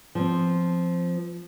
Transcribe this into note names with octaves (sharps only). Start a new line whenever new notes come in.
F3 C4